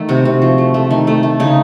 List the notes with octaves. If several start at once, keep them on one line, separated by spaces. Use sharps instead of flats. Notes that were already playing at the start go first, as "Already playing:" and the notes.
Already playing: D#3 A3
C3 F#4
C3
F3
A3
A3
D#3
A3
A3
C#3 D#4